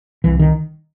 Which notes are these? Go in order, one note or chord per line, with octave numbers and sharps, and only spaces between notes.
C2 E3
D#3